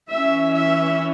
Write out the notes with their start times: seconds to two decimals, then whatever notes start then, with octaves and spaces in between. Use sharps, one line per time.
0.10 E3 C#4 E5
0.54 E5